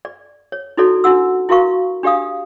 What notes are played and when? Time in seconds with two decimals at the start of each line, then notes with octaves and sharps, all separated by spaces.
0.05 D5
0.52 C#5
0.77 D#4 E4 F#4 A4 C#5 D5
1.04 D4 E4 F#4 F#5 E6
1.49 E4 F#4 A#4 F5 C#6
2.03 D4 G4 D5 F5 D#6